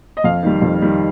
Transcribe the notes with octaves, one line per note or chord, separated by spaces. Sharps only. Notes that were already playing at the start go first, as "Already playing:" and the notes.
D#5
F2 F5
D#3 G3
F2
D#3 G3